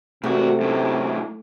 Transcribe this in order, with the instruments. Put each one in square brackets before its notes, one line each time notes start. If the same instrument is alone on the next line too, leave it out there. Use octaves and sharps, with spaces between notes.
[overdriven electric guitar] G#2 F#4 [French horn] C3 [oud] A3
[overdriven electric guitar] F#2 A2